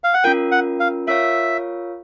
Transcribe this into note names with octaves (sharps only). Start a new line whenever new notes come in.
F5
F#5
C#4 F4 A#4 G5
F#5
F5
F4 A#4 C#5 E5 F5